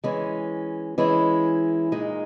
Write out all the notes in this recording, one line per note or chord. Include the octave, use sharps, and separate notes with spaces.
E3 G#3 C#4
E3 G#3 C#4 E4
A#2 G#3 D#4